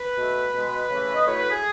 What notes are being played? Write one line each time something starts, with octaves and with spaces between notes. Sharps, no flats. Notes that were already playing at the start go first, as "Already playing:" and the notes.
Already playing: B4
B2 A3
B2 G#3
C#3 E3 A3
D#5
A2 F#3 A3 C#5
B4
G#4